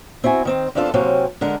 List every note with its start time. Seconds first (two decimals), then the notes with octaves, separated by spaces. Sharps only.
0.24 C4 E4 F#4 G#5
0.45 D#3 C4 C5
0.75 E2 C4 D4 F4 A4
0.94 C3 F#3 A#3 C4 C#4
1.41 D3 G#3 A#4 F#5